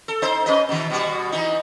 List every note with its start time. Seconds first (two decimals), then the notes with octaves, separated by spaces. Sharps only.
0.08 A4
0.22 D#4 C5
0.46 C#4 B4 D#5
0.69 B2 D#3
0.90 B2 G3 F#4
1.32 E3 D#4